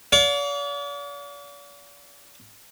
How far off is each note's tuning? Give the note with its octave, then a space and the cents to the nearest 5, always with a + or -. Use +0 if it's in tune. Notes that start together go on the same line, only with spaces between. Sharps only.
D5 -45 F5 +35